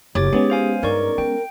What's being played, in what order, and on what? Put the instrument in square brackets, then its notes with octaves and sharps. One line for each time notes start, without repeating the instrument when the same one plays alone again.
[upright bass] F#1 [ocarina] G4 [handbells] C#5 D6 A6
[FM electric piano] G#3 B3 C#4 [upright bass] D#4 [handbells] G#4
[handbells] C5 F5 G#5
[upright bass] G2 [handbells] D#4 D5 C#6 [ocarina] A#4
[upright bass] C4 [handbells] G5